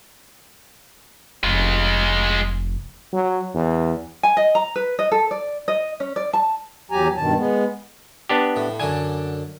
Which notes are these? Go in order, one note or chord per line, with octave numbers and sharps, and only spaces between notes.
F1 G#3 F4
F#3
E2
G#5
D#5
A#5
B4
D#5
A4
D5
D#5
C#4
D5
A5
E2 F#3 G4 G#5 A#5
G2 B2 D#3 A5
G#3 B3
B3 D4 G4
A2
F#2 D3 D4 G#5